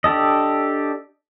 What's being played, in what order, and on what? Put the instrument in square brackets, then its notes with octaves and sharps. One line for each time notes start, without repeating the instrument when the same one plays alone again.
[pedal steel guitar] D4 G4 A4 D#5